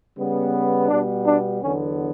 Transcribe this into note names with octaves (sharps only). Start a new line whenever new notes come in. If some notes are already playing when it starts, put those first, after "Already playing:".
C#3 G3 B3
B2 G3 B3 D4
D4
E2 D3 F#3 B3 C#4